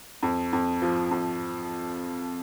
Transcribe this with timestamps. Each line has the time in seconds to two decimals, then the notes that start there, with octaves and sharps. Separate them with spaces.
0.23 F2
0.53 F2
0.82 F3
1.11 F2